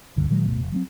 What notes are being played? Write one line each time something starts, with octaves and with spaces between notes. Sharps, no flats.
D#1 C#2 G2 D3
A#2 D#3 F#3 G#3
D1 G1 B2 A3
F1
F#3 A3 C4